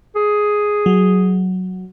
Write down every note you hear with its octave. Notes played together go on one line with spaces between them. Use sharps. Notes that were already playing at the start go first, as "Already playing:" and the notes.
G#4
F#3